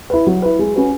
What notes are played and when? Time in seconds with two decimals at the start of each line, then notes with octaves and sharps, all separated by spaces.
0.10 E4 B4
0.27 F#3
0.42 E4 B4
0.59 G#3
0.76 C#4 F#4 B4